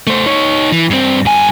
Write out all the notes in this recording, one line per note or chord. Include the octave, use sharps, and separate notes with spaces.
A3 C5
D#4 C#5
E3
G2 C4
G2 G#5